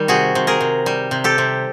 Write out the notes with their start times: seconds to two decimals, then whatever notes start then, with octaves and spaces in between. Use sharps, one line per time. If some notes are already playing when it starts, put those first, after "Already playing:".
Already playing: D#3 G3
0.08 C3 F#4 G#4
0.35 C3
0.47 G#4 A#4
0.61 C3
0.86 G3
1.11 C3
1.24 G4 A4
1.38 C3